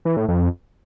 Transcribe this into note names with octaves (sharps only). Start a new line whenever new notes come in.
E3
A2
F2